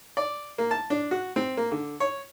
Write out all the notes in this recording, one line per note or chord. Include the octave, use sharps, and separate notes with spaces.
D5
A#3
A5
D4
F#4
C4
A#3
D3
C#5